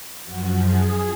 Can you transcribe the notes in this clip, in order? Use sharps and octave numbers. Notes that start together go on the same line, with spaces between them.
F#2 F3 F#4
G#4